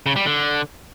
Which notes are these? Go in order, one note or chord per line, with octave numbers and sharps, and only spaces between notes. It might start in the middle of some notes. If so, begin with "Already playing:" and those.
C#3
G3
D3